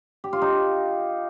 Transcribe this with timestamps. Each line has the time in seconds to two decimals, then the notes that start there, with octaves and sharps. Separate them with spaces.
0.24 G4
0.33 F4
0.42 D#4